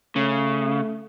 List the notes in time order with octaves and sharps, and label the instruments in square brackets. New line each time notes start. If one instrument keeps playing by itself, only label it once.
[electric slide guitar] C#3 [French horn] A3